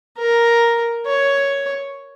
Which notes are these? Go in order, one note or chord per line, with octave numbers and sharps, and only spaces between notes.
A#4
C#5